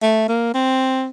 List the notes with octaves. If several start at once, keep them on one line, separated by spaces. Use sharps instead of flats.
A3
A#3
C4